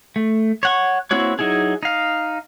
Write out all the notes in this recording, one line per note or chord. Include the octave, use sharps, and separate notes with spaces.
A3
C#5 F#5 C#6
A#3 C4 E4 F#4 C#5
F#3 D#4 E4 G#4
D#4 F5